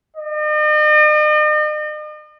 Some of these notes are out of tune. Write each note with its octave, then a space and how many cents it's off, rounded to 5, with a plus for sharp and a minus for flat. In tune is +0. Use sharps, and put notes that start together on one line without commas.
D#5 -45